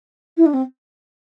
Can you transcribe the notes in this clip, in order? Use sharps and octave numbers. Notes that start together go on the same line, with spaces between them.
E4
D4
C4